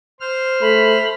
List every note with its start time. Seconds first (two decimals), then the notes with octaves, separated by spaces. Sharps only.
0.20 C5 F6
0.62 A3 B5